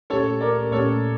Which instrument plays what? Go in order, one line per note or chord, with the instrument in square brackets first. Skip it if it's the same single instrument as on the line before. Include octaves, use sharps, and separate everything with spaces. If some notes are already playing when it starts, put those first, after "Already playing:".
[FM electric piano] A#2 A3 C#4 G4 [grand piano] A4 C#5
[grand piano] A#4 D5
[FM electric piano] A#2 A3 C#4 G4 [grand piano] A4 C#5